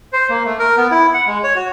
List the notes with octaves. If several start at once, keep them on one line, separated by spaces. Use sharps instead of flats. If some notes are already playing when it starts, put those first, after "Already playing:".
C5
A#3
A3
A#4
B3
E4
F#5
G#3
C#5
F#4